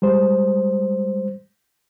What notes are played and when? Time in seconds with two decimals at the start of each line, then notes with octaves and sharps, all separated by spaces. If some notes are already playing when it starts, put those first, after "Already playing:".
0.02 G3 G#3 C5